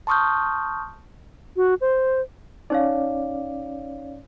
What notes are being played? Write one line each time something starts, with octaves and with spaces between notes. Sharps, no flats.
A5 C6 C#6 D#6 F6 G6
F#4
C5
C#4 D#4 C#5 D5 F5